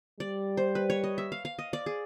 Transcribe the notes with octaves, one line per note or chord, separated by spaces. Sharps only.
G3 D5
C5
B4
C#5
D#5
E5
F5
F5
D#5
D5
G#4